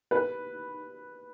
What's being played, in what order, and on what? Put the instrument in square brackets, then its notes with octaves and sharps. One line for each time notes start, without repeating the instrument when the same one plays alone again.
[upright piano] B4